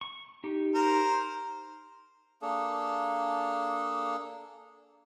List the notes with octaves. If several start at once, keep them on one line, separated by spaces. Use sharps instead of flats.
C#6
D#4 G4
A#4 C5
A#3 D4 G#4 A4